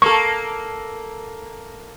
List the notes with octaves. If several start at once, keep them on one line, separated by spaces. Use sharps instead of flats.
A#3 A4 C#6